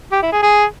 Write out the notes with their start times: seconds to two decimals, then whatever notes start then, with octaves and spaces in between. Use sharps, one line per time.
0.12 G4
0.22 E4
0.32 G#4
0.43 G#4